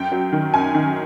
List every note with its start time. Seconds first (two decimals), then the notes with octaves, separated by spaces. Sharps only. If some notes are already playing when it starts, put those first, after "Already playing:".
Already playing: F#2 G5
0.12 F#3
0.33 D#3
0.54 F#2 G#5
0.75 D#3